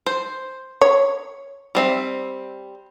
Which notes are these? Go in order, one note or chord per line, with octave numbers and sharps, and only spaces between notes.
C5
C#5
G3 C4 E5